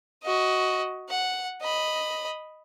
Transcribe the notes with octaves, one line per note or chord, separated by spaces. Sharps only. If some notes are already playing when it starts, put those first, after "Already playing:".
F#4 D#5
F#5
D#5 B5